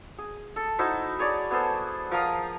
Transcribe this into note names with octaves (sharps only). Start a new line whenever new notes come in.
G#4
A4
D#4 E4 F#4 C5
G#4 C#5 D5
B3 G#4 A4 C5
F3 A#4 F5 D#6